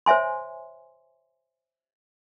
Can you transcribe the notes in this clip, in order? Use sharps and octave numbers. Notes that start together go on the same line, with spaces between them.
C5 C#5 E5 G#5 C6